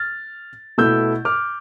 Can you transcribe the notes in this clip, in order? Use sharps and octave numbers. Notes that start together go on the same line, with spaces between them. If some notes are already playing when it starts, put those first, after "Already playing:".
Already playing: F6 A6
B2 A3 E4 E6 G6
D6 F6